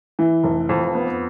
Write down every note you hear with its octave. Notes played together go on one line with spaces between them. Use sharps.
E3
F1
F2
B3